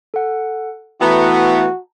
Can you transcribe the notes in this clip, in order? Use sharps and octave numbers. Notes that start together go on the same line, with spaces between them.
A4 F#5
E3 A3 B3 F#4 G5 A5 A#5